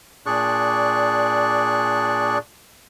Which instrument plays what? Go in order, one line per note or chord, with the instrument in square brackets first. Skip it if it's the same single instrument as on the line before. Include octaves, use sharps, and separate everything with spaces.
[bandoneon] A#2 D4 G#4 D5 C#6 F#6